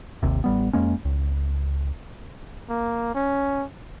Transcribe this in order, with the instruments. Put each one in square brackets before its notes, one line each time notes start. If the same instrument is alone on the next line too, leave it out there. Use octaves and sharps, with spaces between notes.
[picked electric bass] G#1 D#2 C3
A1 G3 B3
F2 G#3 A#3 C#4
C#2
[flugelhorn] A#3
C#4